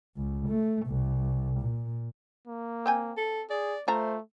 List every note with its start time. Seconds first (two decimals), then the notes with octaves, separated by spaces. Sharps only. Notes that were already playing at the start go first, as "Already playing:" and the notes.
0.16 C#2
0.48 A3
0.86 C2
1.60 A#2
2.47 A#3
2.86 C4 G5 G#5
3.17 A4
3.50 G#4 D5
3.88 A3 F4 C5 E5 A#5